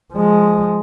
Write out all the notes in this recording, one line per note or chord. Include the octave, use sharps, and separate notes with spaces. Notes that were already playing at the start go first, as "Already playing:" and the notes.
F3 G#3